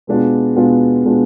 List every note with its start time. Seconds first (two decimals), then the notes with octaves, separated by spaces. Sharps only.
0.07 B2 G#3 B3 D4 F4
0.56 B2 G#3 B3 D4 F4
1.04 B2 G#3 B3 D4 F4